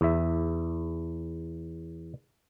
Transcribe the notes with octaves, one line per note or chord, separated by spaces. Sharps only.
E2 E5